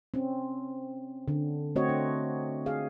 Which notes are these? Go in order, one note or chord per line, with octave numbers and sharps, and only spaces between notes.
C4 C#4
D3
A3 C4 F#4 C#5 D#5
D4
G#4 F5